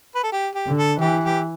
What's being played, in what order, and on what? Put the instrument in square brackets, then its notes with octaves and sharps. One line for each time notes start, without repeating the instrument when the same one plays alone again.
[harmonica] B4
A4
G4
G4
[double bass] D3
[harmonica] A4
[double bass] E3 [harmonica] G4
[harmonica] G4